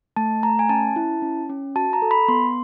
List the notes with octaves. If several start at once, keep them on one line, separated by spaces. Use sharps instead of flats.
A3 A5
A3 A#5
G#5
C#4 A5
E4
C#4
C#4
F#4 A5
A#5
A4
B5
B3 C6